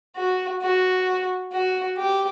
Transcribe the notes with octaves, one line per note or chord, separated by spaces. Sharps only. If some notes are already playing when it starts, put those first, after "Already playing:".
F#4
F#4
F#4
G4